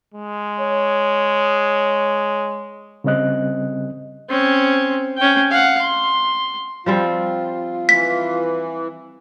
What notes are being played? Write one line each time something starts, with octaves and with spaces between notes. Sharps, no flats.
G#3
C#5
C#3 G3 C4 D#5 F#6
C4 C#4
C#4 G5
F5 F#5
C6
F3 G3 C4 F4
E3 B6